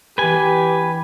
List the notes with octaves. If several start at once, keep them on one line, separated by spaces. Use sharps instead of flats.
E3 B3 D4 G4 B4 G#5